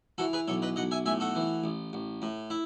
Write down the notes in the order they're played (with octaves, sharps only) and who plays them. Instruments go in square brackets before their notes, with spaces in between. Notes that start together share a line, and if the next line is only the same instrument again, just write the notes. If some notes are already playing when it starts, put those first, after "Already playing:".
[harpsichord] E3 F#4 A4
G#4 B4
B1 A4 C#5
B4 D#5
B1 D#5 F#5
E5 G#5
A2 E5 G#5
F#4 A4
E3
A1
A1
A2
E4